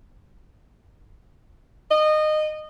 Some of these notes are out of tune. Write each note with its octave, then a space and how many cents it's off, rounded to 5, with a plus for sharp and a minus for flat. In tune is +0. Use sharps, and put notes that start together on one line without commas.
D#5 -20